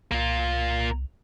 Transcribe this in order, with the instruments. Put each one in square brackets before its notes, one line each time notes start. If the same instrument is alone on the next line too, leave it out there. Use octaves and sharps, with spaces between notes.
[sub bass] C2 [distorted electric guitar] A#3 F4